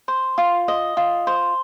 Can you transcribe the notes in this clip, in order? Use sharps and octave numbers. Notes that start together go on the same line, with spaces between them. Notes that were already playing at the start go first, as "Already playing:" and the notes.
C5
F4
D#5
F4
C5